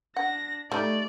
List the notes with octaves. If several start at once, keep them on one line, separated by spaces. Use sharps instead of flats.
D4 F#5 A#6
G3 A3 D#4 D5